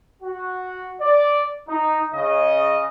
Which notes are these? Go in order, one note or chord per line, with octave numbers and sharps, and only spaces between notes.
F#4
D5
D#4
C#3 D#5